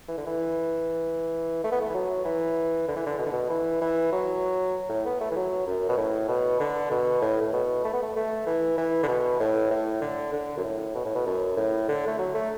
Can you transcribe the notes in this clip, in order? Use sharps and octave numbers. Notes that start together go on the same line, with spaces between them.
E3
D3
E3
A3
B3
A3
E3
F#3
E3
D3
E3
D3
B2
D3
B2
E3
E3
F#3
A2
B3
A3
E3
F#3
F#2
B2
A2
B2
D3
B2
A2
A2
B2
A3
B3
A3
A3
E3
E3
D3
B2
A2
A2
D3
D3
F#2
A2
B2
A2
B2
F#2
A2
D3
A3
F#3
A3